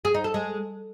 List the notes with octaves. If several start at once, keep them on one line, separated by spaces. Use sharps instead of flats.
G#4
D#4
A4
G#3